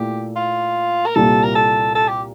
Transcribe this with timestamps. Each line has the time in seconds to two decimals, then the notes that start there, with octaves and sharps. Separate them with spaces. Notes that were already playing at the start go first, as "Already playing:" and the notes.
Already playing: A#2 A3 E4 G4
0.36 F4
1.07 A#4
1.16 C2 A#2 G3 A4
1.43 A#4
1.55 A4
1.95 A4
2.08 G4